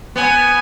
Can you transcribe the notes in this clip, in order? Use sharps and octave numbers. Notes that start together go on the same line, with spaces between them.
B3 G#5